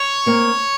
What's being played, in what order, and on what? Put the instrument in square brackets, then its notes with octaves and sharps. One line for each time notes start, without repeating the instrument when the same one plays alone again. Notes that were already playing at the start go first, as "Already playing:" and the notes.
Already playing: [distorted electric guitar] C#5
[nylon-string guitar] A#3 C4